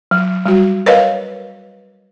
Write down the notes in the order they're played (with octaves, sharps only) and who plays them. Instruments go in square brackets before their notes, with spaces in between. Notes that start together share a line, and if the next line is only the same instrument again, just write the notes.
[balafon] F#3
G3 F#4
A#4 B4 C#5 D#5 F5